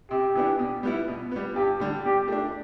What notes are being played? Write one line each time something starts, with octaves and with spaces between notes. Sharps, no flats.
C3 G4
E3 B3 D4
B2
G3 B3 E4
B2
G3 B3
G2 G4
D3 G3 D4
B2 G4
A3 D4